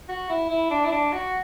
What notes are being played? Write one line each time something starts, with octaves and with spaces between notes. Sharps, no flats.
F#4
E4
E4
D4
E4
D4
F#4